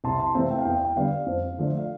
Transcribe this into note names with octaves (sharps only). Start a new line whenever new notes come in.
C2 A5 C6
A5 C6
C3 E3 A3 C4 F5 A5
G5
F5
E2 G5
G5
D3 G3 B3 D4 F5
F2
D3 F3 A3 D4
F5